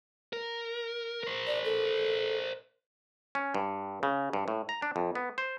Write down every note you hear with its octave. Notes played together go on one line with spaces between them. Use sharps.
A#4
A#4 C5
D5
A4
C#4
G2
C#3
G2
A2
A#5
D4
F2
B3
C5